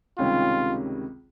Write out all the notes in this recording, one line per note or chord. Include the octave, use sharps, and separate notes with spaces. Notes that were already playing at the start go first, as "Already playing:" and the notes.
C#2 C3 D#3 G3 C#4 F4